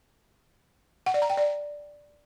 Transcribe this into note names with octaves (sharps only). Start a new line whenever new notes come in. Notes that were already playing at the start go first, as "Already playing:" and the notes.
F#5
D5
A#5
G5
D5